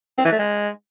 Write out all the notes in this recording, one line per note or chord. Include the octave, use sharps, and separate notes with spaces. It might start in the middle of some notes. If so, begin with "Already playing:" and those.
C4
E3
A3
G#3